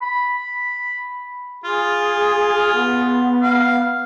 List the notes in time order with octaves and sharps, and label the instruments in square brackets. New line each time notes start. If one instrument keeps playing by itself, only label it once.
[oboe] B5
[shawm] F4 [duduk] G#4
[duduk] B3
[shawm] F5